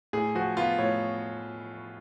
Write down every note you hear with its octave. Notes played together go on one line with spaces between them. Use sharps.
A2 G#4
F3 F#4
B3 F4
A2 C#5